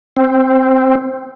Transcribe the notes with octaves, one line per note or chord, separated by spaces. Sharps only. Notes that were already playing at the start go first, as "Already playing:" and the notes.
C4